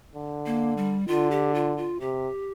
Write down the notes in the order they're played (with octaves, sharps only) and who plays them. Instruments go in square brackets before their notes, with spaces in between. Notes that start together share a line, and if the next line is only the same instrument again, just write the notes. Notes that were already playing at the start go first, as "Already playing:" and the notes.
[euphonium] D3
[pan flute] A#3
G3
[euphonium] D3 [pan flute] F4
[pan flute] G4
F4
F4
[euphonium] C3 [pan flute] G4